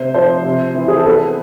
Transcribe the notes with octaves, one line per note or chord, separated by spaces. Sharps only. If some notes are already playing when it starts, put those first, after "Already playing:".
Already playing: C3 C5
F3 C5
C3
E3
G#4
A4
B3 B4